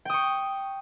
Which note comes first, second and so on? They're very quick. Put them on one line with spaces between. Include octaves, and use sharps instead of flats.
G5 D#6 C#6